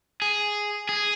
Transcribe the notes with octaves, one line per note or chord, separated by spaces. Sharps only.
G#4
G#4